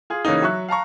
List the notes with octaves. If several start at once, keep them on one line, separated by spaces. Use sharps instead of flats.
F4 G#4
C#3 E3 A#3 C#4 D#4
F#3 E5 C#6 F#6
F5 A5 A#5 C#6